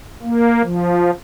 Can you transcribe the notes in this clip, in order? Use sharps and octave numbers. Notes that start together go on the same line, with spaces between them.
A#3
F3